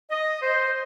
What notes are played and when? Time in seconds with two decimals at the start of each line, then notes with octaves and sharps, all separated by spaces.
0.10 D#5
0.41 C5